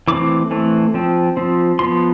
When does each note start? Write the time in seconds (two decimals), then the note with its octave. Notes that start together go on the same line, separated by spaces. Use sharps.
0.08 E3 A3 C4 D6
0.51 E3 A3 C4
0.94 F3 C4
1.37 F3 C4
1.79 F3 B3 C6